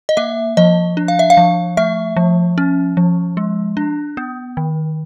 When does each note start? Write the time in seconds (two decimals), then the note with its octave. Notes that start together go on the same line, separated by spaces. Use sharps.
0.09 D#5
0.17 A#3 E5
0.57 F3 D#5
0.97 D4
1.08 F5
1.19 E5
1.30 F5
1.37 F3
1.77 A3 E5
2.17 F3
2.58 C#4
2.97 F3
3.37 G#3
3.77 D4
4.17 B3
4.57 D#3